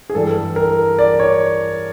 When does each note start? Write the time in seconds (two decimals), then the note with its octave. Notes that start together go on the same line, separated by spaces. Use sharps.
0.10 G#4
0.15 G2 E3 G3 A4
0.56 A#4
0.99 D5
1.20 C#5